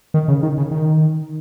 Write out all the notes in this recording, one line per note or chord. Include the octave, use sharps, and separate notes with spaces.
D#3
C#3
D#3
C#3
D#3